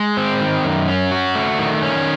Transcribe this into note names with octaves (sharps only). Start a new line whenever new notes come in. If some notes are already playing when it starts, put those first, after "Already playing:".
Already playing: G#3
C4
D#3
F#2
C#4
F#4
A3
D#3
C#4